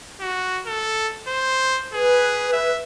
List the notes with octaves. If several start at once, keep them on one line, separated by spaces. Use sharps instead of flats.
F#4
A4
C5
G#4 B4
E5